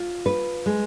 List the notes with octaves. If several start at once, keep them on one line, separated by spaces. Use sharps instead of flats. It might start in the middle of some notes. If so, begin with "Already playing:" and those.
Already playing: F4
B4
G#3